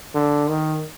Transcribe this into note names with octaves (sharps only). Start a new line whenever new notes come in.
D3
D#3